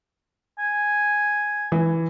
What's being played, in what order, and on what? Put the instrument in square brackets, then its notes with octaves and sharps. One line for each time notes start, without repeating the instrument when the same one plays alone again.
[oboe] G#5
[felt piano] E3